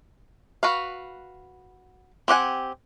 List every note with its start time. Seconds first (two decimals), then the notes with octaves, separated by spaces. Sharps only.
0.63 F#4 B4 F5
2.28 C4 G4 F#5 G#5